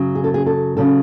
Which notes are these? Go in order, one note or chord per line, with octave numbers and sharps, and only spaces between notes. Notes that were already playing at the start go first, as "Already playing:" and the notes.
Already playing: F#2 C#3 F#3
G#4
A4
G#4
A4
C#3 F#3 A4